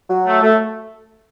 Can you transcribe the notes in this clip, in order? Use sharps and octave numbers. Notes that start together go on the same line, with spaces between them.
F#3
A3
A3